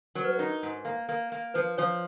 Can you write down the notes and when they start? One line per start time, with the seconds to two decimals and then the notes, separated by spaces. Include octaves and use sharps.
0.15 F#3 A#4
0.24 B4
0.33 A#4
0.39 D#4
0.63 G#2
0.85 A#3
1.09 A#3
1.32 A#3
1.54 F3 B4
1.78 F3 C#5